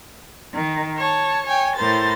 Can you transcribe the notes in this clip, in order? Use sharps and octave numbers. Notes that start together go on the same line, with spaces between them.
D#3
C#5 A5
C#5 G5 G#5
A2 A#4 C5 A6